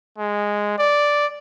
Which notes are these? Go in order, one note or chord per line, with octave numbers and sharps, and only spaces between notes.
G#3
D5